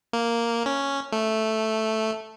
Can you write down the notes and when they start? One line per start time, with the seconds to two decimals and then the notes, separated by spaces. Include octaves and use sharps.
0.13 A#3
0.66 C#4
1.12 A3